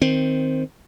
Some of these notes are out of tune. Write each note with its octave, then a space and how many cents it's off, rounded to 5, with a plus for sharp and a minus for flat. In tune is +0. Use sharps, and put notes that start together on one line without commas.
D#3 +5 C4 +0